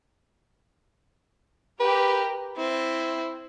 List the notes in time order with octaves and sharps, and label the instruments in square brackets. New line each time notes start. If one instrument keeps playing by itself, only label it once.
[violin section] G4 A#4 [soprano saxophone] B4
[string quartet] C4 [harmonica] E4